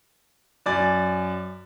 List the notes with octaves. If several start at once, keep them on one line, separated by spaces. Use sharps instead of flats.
F#2 D5 G#5 A6